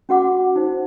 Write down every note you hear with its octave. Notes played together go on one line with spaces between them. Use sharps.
C#4 F#4 F#5 D6
D#4 C5